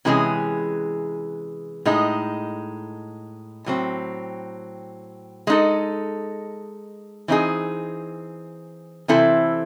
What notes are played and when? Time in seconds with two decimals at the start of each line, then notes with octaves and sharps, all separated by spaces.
0.05 C3 E3 G#3 C#4 G#4
1.85 A2 G#3 D#4
3.66 A2 F#3 C4
5.47 G#3 D#4 A4
7.28 E3 C4 D#4 G#4
9.08 C3 E3 C4 E4 A4